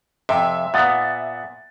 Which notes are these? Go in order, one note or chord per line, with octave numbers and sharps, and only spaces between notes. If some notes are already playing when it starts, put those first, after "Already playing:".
F2 C3 E5
A#2 B3 F#5 D#6 A6